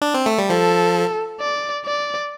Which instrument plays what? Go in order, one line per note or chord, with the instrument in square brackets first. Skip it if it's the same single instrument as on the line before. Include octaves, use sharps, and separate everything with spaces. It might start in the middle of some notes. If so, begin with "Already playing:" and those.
[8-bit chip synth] D4
C4
A3
G3
[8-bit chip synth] F3 [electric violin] A4
[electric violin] D5
D5